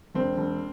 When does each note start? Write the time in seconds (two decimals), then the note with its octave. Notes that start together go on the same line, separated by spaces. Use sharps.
0.15 E1 C4
0.37 E1